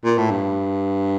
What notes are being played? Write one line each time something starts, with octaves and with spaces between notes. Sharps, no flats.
A#2
A2
G2